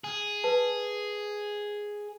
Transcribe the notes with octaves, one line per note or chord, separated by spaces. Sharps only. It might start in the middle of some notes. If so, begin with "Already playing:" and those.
G#4
B4 A5